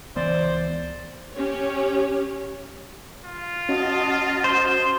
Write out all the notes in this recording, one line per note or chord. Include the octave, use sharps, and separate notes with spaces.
C#2 E3 B3 C5 D5
C#4 G4 C#5
F4
C#4 F#4 D#5 A5
C5